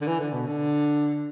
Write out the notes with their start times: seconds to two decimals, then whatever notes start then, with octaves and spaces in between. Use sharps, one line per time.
0.01 D3
0.07 E3
0.20 D3
0.33 B2
0.46 D3